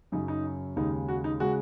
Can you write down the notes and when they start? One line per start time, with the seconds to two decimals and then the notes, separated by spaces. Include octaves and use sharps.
0.12 F#2 C#3 F#3 D#4
0.28 D#4
0.76 D#2 C#3 G#3 D#4
1.08 F#4
1.24 D#4
1.40 C#3 G#3 F#4